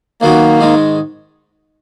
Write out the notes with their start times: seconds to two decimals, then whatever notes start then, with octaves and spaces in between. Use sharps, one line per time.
0.21 D#2 D#3 F#3 A#3 B3 F#4
0.60 G#2 D#3 G#3 D#4